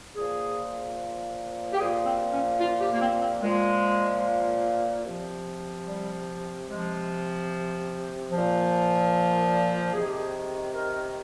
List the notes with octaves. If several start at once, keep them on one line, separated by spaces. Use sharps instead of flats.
A#2 F3 G#4
G4
A#2 F3 G#4
C4
C#4
F4
G4
A#3
C4
C4
A#2 F3 G#3
C3 F3
G3
C3 F3 G#3
A#2 F3
C3 D#3 G#4
G4
G#4
A#4